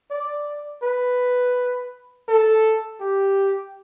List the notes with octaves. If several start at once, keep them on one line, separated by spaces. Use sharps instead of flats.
D5
B4
A4
G4